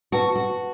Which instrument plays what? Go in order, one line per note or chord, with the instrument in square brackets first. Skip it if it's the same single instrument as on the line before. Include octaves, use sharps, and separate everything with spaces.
[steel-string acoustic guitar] F#4 [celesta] B4 F#5 A5
[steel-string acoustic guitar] F#4